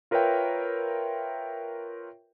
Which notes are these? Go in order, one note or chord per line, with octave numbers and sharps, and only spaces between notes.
F4 A#4 B4 C#5 E5 G5